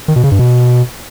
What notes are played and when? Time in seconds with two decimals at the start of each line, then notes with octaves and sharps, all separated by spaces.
0.08 D#3
0.16 B2
0.24 C#3
0.31 G2
0.39 B2